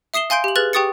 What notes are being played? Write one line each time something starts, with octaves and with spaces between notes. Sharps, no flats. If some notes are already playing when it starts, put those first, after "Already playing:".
E5 D#6 C7 E7 G7
F5 G#5 C6 G6 D7
G4 F#7
G#4 B4 F6 F#6 A6 F#7
G4 G5 C#6 D#6 A6 C#7